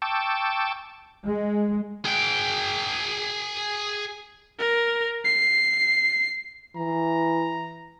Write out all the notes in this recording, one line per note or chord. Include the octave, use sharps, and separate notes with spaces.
G5 A5 C#6 D6 E6
G#3
G#4 G5
A#4
C7
E3 A#5